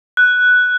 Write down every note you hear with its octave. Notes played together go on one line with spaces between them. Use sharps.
F#6